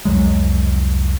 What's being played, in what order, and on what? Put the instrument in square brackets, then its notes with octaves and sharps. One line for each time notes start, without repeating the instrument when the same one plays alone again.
[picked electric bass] C2 F2 F#3 G#3